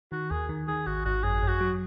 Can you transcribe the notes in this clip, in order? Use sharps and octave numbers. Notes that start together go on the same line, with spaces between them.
D#3 F#4
D#2 G#4
D#3
D#3 G#4
G#1 F#4
G#1 F#4
F#2 G#4
F#2
F#4
F#3